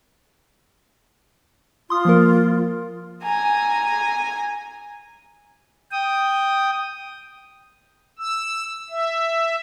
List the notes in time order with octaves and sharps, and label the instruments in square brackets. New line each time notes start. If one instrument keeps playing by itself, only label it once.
[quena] F4 [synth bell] C6 D#6
[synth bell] F3 A#3 A#4
[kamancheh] G#5 A#5
[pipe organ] G5 D#6
E6
E5